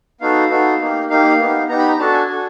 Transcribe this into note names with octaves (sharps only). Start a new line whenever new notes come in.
B3 D#4 F#4 A4 F5
B3 D#4 F#4 A4
A#3 D#4 G4
A#3 D#4 G4 F5
B3 D#4 G4
B3 D#4 G4 A#5
B5
A#5
D4 F#4 A4 A5
G#5
D4 F#4 A4